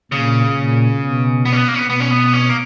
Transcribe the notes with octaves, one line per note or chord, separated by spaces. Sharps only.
A#2 C#3
A#2
B2
B3
C#4
B3
A#3
C#4
B3
B2 B3
C#4
B3
C#4
A#3